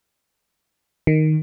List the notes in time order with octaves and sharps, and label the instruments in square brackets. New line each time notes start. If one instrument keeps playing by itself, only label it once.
[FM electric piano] D#3